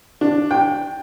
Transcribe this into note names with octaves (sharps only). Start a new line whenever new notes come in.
D4
G5